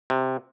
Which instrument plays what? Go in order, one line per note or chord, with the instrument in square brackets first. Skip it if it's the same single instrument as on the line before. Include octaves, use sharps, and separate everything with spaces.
[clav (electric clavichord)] C3